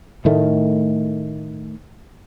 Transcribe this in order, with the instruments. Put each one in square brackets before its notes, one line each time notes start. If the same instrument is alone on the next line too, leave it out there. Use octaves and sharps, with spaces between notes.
[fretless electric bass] A2 D#3 A3